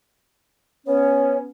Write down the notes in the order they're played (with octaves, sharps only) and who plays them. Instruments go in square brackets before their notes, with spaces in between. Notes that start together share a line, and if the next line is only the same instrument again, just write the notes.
[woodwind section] B3 C#4 [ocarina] C#5